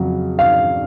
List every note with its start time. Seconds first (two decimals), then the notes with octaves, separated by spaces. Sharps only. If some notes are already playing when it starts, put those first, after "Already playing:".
Already playing: F2 C#3 F#3
0.39 F5